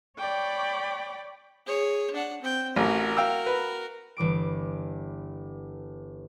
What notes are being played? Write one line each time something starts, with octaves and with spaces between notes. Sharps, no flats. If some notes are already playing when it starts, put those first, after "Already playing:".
C#5 D5 G5 B5 D6
G#4 C#5
D4 F#5
C4 G5
A1 F#4 A#4
F5 G5 E6
B4
G1 E3 D6 D7